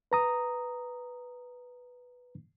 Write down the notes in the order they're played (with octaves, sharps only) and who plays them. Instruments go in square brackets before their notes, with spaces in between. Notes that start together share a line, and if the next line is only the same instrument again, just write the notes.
[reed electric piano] B4 A#5 D#6